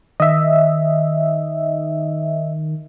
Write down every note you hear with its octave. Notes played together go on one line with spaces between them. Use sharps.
D#3 D#5 E5